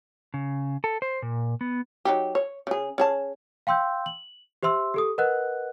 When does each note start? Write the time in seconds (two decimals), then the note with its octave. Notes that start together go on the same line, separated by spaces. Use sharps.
0.34 C#3
0.84 A4
1.02 C5
1.22 A#2
1.61 B3
2.05 F#3 D#4 G4
2.35 C#5
2.67 C#3 G#4
2.98 C#4 G#4 A5
3.67 F5 G5 C6 E6 G6
4.06 F#7
4.63 G4 C5 E5 C6 E6
4.94 G4 A4 D#6
5.18 A#4 B4 D#5 F#5 F#6